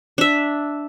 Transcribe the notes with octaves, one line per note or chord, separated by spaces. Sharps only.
D4 E5